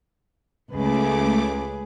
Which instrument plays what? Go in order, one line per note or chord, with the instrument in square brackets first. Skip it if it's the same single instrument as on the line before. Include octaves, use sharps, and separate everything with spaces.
[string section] C#2 [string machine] A3 D6 [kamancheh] G#4 B4